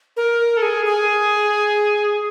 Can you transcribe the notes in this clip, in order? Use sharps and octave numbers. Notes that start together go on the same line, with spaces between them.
A#4
A4
G#4
G#4